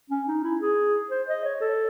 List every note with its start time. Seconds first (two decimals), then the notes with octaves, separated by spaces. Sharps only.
0.10 C#4
0.28 D#4
0.44 E4
0.61 G#4
1.11 C5
1.28 D#5
1.44 C#5
1.61 A4